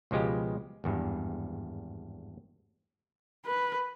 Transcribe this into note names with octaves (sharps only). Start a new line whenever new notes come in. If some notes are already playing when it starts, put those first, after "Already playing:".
C#2 B2 F3 G#3 G4
G#1 E2 G2
B4